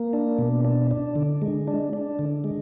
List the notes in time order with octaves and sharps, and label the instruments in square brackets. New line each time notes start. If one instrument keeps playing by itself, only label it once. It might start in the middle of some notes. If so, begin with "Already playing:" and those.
Already playing: [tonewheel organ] A#3
D4
B2
D4
D4
D3
G#3
D4
D4
D3
G#3